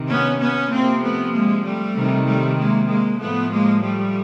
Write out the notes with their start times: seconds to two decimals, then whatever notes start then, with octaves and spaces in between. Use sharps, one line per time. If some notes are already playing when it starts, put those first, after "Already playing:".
Already playing: C3 D#3
0.09 B3 C#4
0.40 B3 C#4
0.71 C3 F3 A#3 C4
1.02 A3 B3
1.33 G#3 A#3
1.64 G3 A3
1.95 C3 D#3
2.27 G3 A3
2.58 G#3 A#3
2.89 G#3 A#3
3.20 A2 F3 A3 B3
3.51 G#3 A#3
3.82 G3 A3